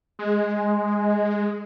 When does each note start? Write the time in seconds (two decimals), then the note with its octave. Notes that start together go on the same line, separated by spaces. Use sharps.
0.19 G#3